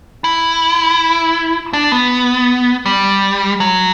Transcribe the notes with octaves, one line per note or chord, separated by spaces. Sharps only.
E4
D4
B3
G3
F#3